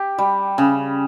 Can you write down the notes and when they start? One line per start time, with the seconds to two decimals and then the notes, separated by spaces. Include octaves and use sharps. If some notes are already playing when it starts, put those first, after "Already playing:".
Already playing: G4
0.18 G3
0.58 C#3